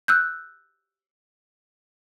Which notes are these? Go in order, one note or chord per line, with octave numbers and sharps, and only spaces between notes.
E6 F#6 G6